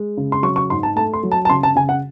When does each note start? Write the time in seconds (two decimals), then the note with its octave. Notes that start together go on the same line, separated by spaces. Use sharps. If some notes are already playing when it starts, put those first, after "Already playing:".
Already playing: G#3
0.17 C#3
0.32 C6
0.43 F#3 C#6
0.56 C#6
0.70 G#2 C6
0.83 A5
0.96 A3 A5
1.13 C6
1.23 F#3
1.32 A5
1.45 A5
1.50 C#3 C6
1.63 A5
1.75 C#3 G#5
1.89 F#5